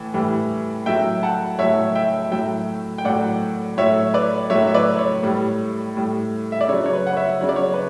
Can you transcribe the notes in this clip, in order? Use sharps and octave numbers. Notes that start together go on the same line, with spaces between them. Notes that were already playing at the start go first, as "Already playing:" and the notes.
Already playing: A2 E3
A2 E3 G3
A2 F#3 E5 G5
F#5 A5
A2 F#3 C#5 E5
E5 G5
A2 F#3 E5 G5
G5
A2 F#3 D5 F#5
A2 F#3 C#5 E5
B4 D5
A2 F#3 C#5 E5
E5
B4 D5
C#5
A2 G3
A2 G3
E5
D5
C#3 F#3 C#5
C#5
B4
F#5
C#5 E5
C#3 F#3 C#5
D5
C#5
B4